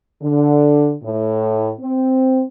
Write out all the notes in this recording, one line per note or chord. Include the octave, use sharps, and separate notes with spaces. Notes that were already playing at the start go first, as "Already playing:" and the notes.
D3
A2
C4